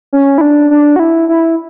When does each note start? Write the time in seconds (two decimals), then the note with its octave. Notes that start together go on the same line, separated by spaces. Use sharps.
0.13 C#4
0.38 E4
0.41 D4
0.71 D4
0.96 F#4
0.99 E4
1.29 E4